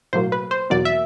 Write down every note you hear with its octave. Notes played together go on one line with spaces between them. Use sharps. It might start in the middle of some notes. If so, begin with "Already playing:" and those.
B1 A2 F#3 A#3 C5
B4
C5
E2 B2 F#3 A#3 D5
E5